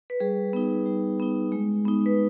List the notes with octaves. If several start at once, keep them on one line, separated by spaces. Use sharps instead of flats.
B4
G3 G#4
B3 D#4
G3
B3 D#4
G#3
B3 D#4
B4